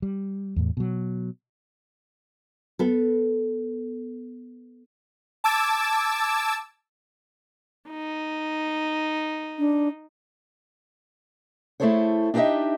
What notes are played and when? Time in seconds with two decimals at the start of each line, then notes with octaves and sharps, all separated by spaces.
0.02 G3
0.56 E2 A2
0.77 B2 F#3
2.79 B3 A4
5.44 A5 D6 E6 G#6
7.89 D#4
9.59 D4
11.80 A3 E4 G#4 A4 C5 C#5
12.34 D4 D#4 G4 B4 D#5 E5